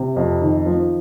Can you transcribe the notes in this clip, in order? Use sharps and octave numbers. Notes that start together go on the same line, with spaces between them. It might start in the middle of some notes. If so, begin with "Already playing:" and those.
Already playing: C3
F2
D#3
F3